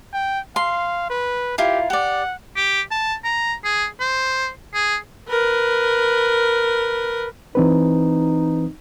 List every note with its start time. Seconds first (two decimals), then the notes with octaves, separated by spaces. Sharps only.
0.13 G5
0.56 F5 C6
1.10 B4
1.58 E4 F4 G4 A#4
1.90 G4 D5 F#5
2.57 G4
2.91 A5
3.24 A#5
3.65 G#4
4.00 C5
4.74 G#4
5.29 A#4 B4
7.55 E3 C4 D#4 B4